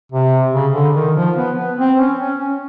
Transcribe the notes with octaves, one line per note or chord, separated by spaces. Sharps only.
C3
C#3
D3
D#3
F3
B3
B3
C4
C#4
C#4
C#4